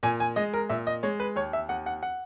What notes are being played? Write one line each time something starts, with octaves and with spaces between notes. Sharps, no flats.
A#2 G#5
G#5
G#3 D#5
A#4
A#2 E5
D#5
G#3 C#5
B4
D#2 C#5
E5
D#2 F#5
F#5
F#5